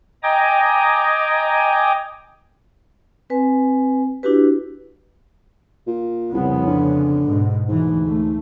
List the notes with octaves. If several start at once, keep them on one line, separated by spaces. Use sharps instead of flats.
D#5 G5 G#5 A#5 D6 D#6
C4 B4 G#5
D4 E4 F#4 G4 B4
A#2
C2 F2 C#3 B3
D3
G#2 B2
D2 G#2 E3
A3